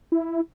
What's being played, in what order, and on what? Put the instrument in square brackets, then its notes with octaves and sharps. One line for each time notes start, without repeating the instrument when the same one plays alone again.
[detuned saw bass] E4